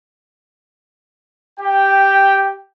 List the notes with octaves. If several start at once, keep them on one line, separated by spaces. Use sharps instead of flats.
G4 G5